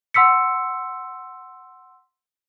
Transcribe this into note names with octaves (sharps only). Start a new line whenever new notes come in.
F#5 C6 E6 B6 C#7